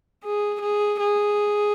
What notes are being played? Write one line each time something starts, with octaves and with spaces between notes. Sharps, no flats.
G#4
G#4
G#4